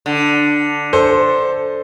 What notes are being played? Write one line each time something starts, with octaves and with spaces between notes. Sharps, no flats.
D3
A4 C5